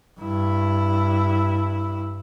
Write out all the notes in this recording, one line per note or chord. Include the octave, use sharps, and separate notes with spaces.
G2 E4